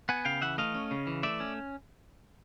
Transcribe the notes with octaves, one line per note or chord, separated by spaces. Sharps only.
B3 F#5 G#5
C#3 F5 G5
E3 E5 F#5
A3 D#5 F5
C#4
C#3
E3
A3 D5 E5
C#4